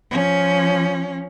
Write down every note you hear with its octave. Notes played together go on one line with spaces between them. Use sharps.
F3 C#4